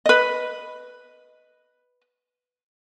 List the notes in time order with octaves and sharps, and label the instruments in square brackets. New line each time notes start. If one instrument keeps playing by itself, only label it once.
[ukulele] B4 D#5